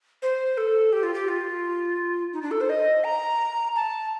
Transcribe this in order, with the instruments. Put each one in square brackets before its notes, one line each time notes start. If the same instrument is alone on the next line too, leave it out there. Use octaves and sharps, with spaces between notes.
[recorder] C5
A4
G4
F4
G4
F4
D#4
D4
A4
C5
D#5
A#5
A5